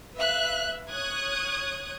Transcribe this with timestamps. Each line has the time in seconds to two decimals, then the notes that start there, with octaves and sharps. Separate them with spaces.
0.18 B4 E5 F5 F#6
0.91 C#5 D#6 F#6 G#6